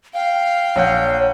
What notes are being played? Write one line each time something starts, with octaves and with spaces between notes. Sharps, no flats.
F5 G5
A#1 C#5 F#5 G6